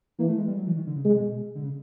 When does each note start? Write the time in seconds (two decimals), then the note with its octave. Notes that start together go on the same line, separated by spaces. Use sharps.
0.19 E3 A#3
0.28 A3
0.38 G#3
0.47 G3
0.57 F#3
0.67 E3
0.77 D#3
0.87 D3
0.96 C#3
1.05 C3 G#3
1.20 B2
1.55 D3
1.64 C#3